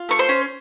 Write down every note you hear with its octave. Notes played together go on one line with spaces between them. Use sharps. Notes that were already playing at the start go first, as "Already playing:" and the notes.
Already playing: F4
A3 C#6
C5 C6
C#4